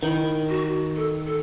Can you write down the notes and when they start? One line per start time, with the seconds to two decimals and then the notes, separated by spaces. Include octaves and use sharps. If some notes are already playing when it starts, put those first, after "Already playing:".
0.03 D#3 E4
0.49 F#4
0.96 A4
1.27 A4